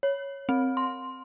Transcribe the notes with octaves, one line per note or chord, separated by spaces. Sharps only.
C#5
C4
C6